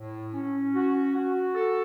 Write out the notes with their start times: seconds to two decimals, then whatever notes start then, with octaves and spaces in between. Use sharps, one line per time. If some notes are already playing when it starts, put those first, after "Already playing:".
Already playing: A2
0.33 C#4
0.74 F#4
1.14 F#4
1.55 A4